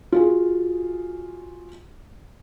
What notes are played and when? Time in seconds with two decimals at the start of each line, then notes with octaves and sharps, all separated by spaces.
0.12 F4 F#4 G#4